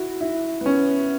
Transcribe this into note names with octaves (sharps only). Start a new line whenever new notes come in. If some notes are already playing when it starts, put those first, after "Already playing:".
Already playing: E4 F#4
E4
B3
C#4